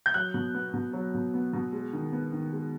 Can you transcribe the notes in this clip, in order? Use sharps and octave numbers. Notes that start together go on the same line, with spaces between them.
G6
F#3 F#6
B2
B3
B2
F#3
B2
B3
B2
G#3
D#3
B3
D#3
G#3